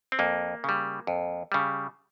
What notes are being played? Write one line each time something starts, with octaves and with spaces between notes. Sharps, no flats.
C4
F2 A#3
C#3 G3
F2
C#3 G3